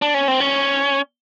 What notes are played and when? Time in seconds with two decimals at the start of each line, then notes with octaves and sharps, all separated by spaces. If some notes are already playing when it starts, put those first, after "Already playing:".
0.02 D4
0.14 C#4
0.28 C4
0.40 C#4